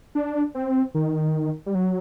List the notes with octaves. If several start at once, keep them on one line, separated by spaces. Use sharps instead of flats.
D4
C4
D#3
G3
F#3